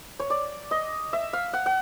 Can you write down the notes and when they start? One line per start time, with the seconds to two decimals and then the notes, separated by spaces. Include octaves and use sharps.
0.20 C#5
0.30 D5
0.71 D#5
1.13 E5
1.33 F5
1.53 F#5
1.66 F#5